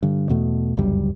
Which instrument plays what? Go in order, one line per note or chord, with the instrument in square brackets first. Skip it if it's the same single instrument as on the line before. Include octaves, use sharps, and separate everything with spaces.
[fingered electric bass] G2 D3
E2 B2 A3
G1 C#2 F#2 G3